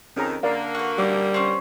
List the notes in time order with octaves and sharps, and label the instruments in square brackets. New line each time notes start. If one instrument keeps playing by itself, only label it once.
[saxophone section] F2 D#3 [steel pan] C#4 G#4 A#5
[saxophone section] D3 A#3 [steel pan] A#4 D5 F5
[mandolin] F#4 B4
[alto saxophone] G3 [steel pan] D6
[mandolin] C4 C#4